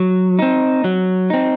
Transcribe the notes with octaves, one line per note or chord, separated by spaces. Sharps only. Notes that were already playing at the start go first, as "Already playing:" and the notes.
Already playing: F#3
C4 D#4
F#3
C4 D#4